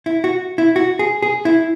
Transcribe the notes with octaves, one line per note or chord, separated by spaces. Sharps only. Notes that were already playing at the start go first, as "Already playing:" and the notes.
E4
F#4
E4
F#4
G#4
G#4
E4